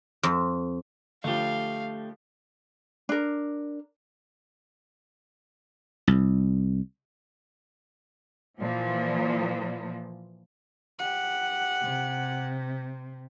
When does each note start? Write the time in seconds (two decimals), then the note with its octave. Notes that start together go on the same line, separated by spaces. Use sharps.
0.23 F2
1.24 D3 F3 A3 G4 F5
3.09 D4 A#4
6.07 C2
8.60 A#2 E3 F3
10.99 G4 F#5
11.83 C3